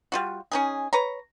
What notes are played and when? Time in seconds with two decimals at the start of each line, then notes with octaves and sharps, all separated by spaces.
0.12 G3 F4 F#4
0.52 C#4 D#4 G#4
0.93 B4 C#5 A#5